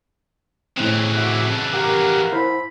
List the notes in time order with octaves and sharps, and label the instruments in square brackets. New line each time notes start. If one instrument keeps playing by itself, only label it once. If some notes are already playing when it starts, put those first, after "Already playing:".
[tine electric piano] A2 C4 [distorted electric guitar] C#3 E3
[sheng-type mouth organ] F#4 E5 D6
A5
[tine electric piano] G4 [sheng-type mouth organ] A#4 F5 F#5
[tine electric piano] E4 C5 [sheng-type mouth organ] B5